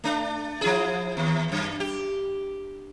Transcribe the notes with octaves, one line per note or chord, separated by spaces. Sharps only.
A3 D4
F3 E4 G#4
D#2
F#2
G4